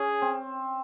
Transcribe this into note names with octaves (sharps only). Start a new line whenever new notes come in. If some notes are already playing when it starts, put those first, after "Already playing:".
Already playing: C#4 G#4
C4